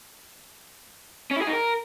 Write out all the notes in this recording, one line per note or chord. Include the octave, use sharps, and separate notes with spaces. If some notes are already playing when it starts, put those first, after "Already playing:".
C#4
E4
G#4
D#4
A#4